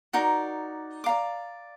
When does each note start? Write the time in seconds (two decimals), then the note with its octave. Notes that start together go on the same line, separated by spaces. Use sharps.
0.13 D#4 F#4 A#4 D5
1.04 D5 F5 A#5 D6